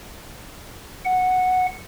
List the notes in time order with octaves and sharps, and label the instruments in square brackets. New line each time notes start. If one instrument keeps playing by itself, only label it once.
[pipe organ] F#5